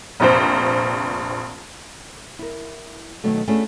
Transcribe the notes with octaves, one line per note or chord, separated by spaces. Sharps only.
F1 A#1 C5
E4 A#4
B2 D#3 F#3 A3
A3 C#4 D4 E4 F#4 G#4